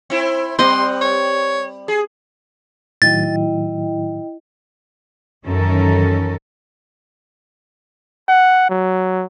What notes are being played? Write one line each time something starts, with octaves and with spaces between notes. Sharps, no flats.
C4 E4
G3 C4 D#5 F#5 C6
C#5
G#4
A2 D#3 F#3 E4 D#5 G5 A6
F#2 D#3 E3 C#4 A4 A#4
F#5
F#3